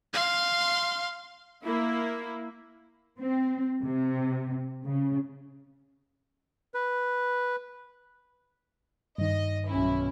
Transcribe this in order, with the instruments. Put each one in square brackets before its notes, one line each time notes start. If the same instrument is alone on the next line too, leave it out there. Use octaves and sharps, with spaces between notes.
[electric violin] F5 C6
[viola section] A#3 E4
[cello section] C4
C3
C#3
[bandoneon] B4
[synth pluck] G2 D#3 [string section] D#5
[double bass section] B1 C#4 [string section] E4